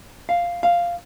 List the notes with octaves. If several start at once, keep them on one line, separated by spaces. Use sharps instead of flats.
F5
F5